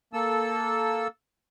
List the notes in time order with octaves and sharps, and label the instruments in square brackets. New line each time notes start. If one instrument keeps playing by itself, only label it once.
[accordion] A#3 A4 E6